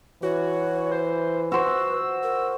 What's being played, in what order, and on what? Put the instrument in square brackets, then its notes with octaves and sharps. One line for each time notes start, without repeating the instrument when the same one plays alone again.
[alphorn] E3 [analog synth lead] F#4 [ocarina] C#5
[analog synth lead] C5
[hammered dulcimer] F#4 C5 [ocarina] B4 [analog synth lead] E6
[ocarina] A#4